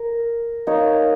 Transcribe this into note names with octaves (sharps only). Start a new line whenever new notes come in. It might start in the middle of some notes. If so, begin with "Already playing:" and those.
Already playing: A#4
A#3 D#4 C#5